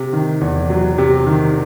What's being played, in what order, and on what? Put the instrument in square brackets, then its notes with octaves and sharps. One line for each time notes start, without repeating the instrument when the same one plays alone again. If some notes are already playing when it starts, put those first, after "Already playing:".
Already playing: [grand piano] C3
D#3
E2
F#3
C3
D#3